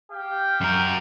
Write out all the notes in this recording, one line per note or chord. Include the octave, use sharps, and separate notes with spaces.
G4 F5 G5
F#2 A#4